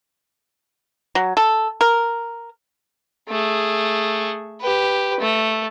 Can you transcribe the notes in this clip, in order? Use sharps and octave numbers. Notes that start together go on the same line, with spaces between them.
F#3
A4
A#4
A3 G#4
G4 B4
A3